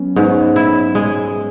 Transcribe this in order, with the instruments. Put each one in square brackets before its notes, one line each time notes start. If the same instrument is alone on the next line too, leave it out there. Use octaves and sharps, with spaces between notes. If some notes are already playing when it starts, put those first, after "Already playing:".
Already playing: [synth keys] F#3 B3 C#4
[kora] G#2 [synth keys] B4
[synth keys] C#5
B4
[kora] E4
G#3